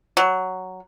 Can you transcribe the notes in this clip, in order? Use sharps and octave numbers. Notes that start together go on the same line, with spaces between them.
F#3